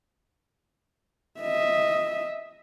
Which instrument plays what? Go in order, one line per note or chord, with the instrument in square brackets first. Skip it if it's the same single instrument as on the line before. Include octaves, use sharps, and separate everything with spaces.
[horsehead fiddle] D#5 E5